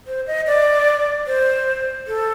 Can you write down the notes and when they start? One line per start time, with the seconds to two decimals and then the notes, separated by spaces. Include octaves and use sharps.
0.07 C5
0.27 D#5
0.47 D5
1.27 C5
2.07 A4